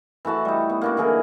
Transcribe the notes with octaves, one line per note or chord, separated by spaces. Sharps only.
E3 A3 F#4 A5
G3 D#4
B3
A#3 D4 F#4
D3 E3 G#4 A#4